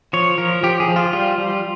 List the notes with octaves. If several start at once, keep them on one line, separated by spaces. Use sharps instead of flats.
F3 C#5
F3 A#4
F3 G4
G#4
F3
F4
G3 F4
G3